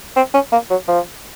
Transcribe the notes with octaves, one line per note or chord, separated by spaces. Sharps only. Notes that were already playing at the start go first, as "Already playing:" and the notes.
C4
C#4
A#3
F#3
F3